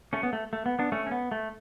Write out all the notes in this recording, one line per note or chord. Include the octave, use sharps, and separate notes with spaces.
A3 C#4
B3
A3
A3
B3
B3 D4
A3 C#4
C#4
B3
A3